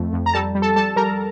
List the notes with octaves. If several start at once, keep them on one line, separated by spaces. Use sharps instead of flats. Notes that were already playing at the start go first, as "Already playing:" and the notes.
Already playing: F2 A3
F2
A#5
G3 A4 A5
G3
A4 A5
G3 A4 A5
G3 A#4 A#5